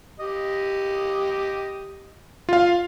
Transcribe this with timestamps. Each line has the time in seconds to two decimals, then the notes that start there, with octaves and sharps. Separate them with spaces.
0.20 G4 D#5
2.49 F4 F5